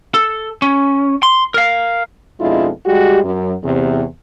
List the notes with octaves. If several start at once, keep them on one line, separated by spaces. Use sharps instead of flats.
A4
C#4
C6
A#4 F5
F2 B2 G#3 D4 E4 F4
G3 G#3 F#4 G4
F#2
E2 C3